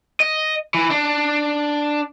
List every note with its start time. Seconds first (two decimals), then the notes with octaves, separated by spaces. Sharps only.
0.20 D#5
0.74 E3
0.91 D4